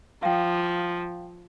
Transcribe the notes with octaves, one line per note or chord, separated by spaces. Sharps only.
F3 F5 G5